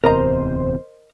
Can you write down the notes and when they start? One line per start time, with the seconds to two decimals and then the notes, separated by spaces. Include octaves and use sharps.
0.04 D1 E2 C3 A#4 C5 D#5 A#5